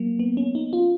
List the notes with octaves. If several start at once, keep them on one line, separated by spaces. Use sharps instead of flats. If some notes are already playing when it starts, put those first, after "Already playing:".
Already playing: F#3 A#3
B3
C#4
D#4
F4